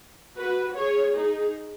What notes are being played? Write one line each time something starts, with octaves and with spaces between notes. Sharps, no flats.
F#4 B4
G#4 C#5
D#4 G#4